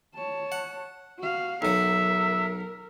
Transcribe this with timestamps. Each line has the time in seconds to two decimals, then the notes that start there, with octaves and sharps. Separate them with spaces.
0.15 C#5 A5
0.52 F#5
1.19 F#4 F5
1.62 B1 F#3 A#4 E5